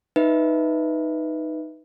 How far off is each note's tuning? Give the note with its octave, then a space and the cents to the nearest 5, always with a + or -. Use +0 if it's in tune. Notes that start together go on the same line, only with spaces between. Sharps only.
D#4 +0 B4 +0 E5 +0